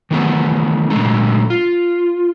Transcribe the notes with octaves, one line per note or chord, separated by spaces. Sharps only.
D#3 E3 A3 B3
A#2 D3 F#3 G#3 A3 D#4
F4